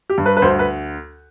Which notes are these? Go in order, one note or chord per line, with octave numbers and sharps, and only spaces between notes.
G4
G2
B4
B4
D2 C5
B4